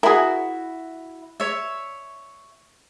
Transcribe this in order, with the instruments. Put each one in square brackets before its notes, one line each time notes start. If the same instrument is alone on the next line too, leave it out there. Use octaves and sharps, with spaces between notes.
[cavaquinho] E4 F#4 [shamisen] G#4 A#4
[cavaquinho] C#5 E5